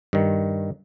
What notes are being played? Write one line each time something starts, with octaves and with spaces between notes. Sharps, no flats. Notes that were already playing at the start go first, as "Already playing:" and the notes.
G2 D#3